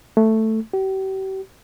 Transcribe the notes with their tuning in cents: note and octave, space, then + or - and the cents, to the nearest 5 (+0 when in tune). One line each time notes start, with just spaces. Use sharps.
A3 +5
G4 -40